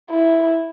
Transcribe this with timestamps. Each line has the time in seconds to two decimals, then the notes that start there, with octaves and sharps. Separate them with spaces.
0.10 E4